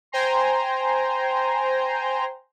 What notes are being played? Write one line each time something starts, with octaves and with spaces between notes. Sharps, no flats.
C5 G5 G#5 A#5 C6